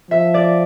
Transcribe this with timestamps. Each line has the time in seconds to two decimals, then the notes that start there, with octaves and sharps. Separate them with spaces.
0.11 F3 E5
0.34 D5